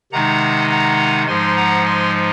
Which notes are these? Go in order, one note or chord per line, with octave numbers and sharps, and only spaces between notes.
C3 D#3 G#3 D#4 F#5 A#5
F#5 A#5
G#2 F3 G#3 D#4 G#5 C6
F#5 A#5
G#5 C6